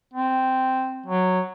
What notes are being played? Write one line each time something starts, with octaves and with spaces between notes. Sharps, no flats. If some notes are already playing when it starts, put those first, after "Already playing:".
C4
F#3